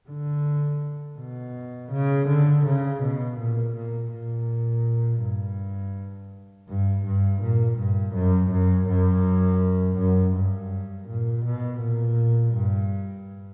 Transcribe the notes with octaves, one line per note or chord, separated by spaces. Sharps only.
D3
B2
C#3
D3
C#3
B2
A#2
A#2
A#2
G2
G2
G2
A#2
G2
F#2
F#2
F#2
F#2
G2
A#2
B2
A#2
G2